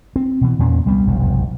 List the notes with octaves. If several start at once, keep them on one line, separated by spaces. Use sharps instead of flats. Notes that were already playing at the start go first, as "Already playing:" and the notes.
C4
B2 E3
E2 A#2 A#3 C#4
C2 G3 B3
F1 B1 E2 G2